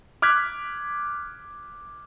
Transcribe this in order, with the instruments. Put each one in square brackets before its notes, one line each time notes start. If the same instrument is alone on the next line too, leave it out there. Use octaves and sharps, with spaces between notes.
[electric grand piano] D6 F6 F#6 G#6 B6